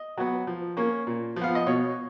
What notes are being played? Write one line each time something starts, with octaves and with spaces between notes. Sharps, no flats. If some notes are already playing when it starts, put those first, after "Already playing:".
Already playing: D#5
F#3 B3
F3
A#3 C#4
A#2
F3
B3 F5
D#5
B2 C#5